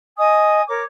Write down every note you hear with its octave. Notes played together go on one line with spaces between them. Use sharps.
D#5 G#5 D#6
A#4 C#5 D6